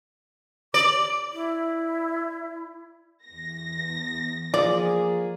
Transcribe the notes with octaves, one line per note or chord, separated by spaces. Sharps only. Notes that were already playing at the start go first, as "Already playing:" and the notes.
D5 D6
E4
E2 A#6
F3 A#3 G#4 D5